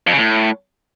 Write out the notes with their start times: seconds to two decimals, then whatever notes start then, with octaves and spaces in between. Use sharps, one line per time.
0.07 F2
0.12 C#3
0.18 A2